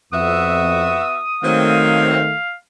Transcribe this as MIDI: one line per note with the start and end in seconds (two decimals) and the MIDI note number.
0.13 1.01 41
0.13 1.24 59
0.13 1.24 66
0.13 1.24 76
0.13 2.10 87
1.43 2.33 51
1.43 2.22 54
1.43 2.33 57
1.43 2.22 58
1.43 2.22 60
1.43 2.57 77